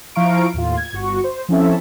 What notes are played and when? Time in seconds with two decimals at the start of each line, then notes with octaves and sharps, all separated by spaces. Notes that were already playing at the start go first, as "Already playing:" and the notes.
0.15 F3 E4 F5 A#5 C#6 D7
0.54 D#2 A2 F4
0.77 G#6
0.93 G1 F#4 C#6
1.24 C5
1.49 F3 C4 C#4 E4 A4 E5